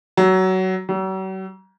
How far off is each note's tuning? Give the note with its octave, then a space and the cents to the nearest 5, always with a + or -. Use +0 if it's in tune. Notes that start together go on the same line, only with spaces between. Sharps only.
F#3 +20
F#3 +45